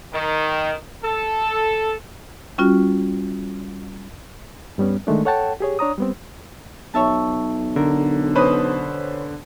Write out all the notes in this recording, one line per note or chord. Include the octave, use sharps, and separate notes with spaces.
D#3
A4
G3 C#4 F4 F#4
G2 G3 B3 C#4
D#3 G#3 A3 D4
A4 C#5 F#5 G5 A5
G4 G#4 C#5
D4 C#5 A#5 D#6
G3 B3 C4
B1 C#5 E5 A5
D3 A#4
B2 C#4 B4 C5 D#6